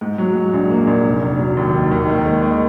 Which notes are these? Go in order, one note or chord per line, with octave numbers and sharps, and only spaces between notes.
G#2
F#3
G#2
A#1
A#3
A#1
F1
F1
F#3
D#2
D#3
D#2
D#3
G#3
D#3